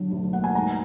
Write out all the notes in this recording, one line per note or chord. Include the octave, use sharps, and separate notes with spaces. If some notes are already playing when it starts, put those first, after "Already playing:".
Already playing: B1 D3 F#3
D2
A#3 F#5
G#5
G#2 A#5